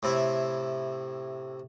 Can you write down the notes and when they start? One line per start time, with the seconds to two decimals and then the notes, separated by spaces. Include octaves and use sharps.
0.03 A2 C3 E4